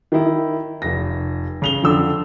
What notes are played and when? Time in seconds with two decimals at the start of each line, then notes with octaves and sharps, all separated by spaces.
0.12 D#3 E4
0.82 F1 A#6
1.62 C#3 F7 G7
1.82 F2 D3 E6